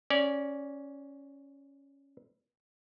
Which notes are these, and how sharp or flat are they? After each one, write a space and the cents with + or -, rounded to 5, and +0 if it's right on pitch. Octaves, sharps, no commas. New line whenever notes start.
C#4 +0 D5 -15